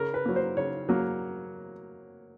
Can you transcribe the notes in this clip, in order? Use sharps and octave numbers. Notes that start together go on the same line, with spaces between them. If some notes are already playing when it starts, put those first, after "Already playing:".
Already playing: C#3 A#4
B4
F#3 A#3
C5
C#3 C#5
F#3 A#3